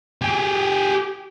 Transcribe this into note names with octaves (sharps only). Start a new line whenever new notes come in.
G4 G#4